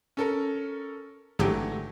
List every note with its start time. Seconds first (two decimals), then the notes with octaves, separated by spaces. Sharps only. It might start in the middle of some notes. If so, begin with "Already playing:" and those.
0.17 C#4 A4 A#4
1.39 G#1 D3 E3 F#3 A3 G4